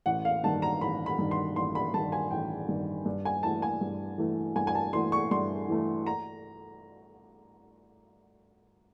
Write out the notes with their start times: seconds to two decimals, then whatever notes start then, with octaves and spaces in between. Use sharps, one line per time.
0.06 A1 F#5
0.25 F5
0.43 G2 D#3 A5
0.62 A#5
0.81 A1 B5
1.06 B5
1.18 G2 D#3
1.31 C6
1.56 A1 C6
1.75 B5
1.94 G2 D#3 A5
2.12 G#5
2.31 A1 G5
2.68 G2 D#3
3.05 G2
3.25 G#5
3.43 E3 A3 A5
3.62 G#5
3.81 G2
4.18 E3 A3
4.56 G2 G#5
4.67 G#5
4.75 A5
4.93 E3 A3 C6
5.12 C#6
5.31 G2 C6
5.68 E3 A3
6.07 A#5